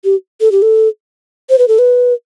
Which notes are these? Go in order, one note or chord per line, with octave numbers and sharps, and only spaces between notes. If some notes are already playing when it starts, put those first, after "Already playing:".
G4
A4
G4
A4
C5
B4
A4
B4